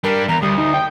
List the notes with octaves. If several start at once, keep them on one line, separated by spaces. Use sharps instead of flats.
G3 D4 A#4
E2 A#5
D2 G3 D#6
D#4
G5